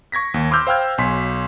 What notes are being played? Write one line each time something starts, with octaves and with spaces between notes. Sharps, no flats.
C#6 G#6 A#6 B6
D#2
B5 C6 D6 E6 F6 G6
C5 F5 G5 E6 F6 G#6
B1 G#5 C6 B6